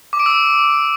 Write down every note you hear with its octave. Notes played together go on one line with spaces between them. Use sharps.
D6
D7
E6